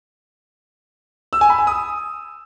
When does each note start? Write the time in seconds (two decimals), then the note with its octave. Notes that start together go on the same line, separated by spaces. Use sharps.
1.33 E6
1.41 G#5
1.50 B5
1.58 G#5
1.67 D#6